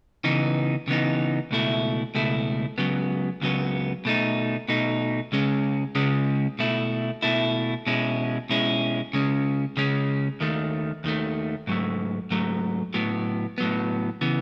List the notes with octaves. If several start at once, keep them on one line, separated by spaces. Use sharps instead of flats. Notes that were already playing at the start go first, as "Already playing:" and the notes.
C#3 E3 B3 D#4
C#3 E3 B3 D#4
C#2 B2 A3 E4
C#2 B2 A3 E4
C#2 C#3 F#3 B3
C#2 C#3 F#3 B3
B2 A3 D#4
B2 A3 D#4
C#2 C#3 G#3 C#4
C#2 C#3 G#3 C#4
B2 A3 E4
B2 A3 E4
B2 G#3 C#4 E4
B2 G#3 C#4 E4
C#3 G#3 C#4
C#3 G#3 C#4
D#2 D#3 A3
D#2 D#3 A3
G#2 F#3 A3
G#2 F#3 A3
A2 F#3 B3
A2 F#3 B3
C#3 E3 B3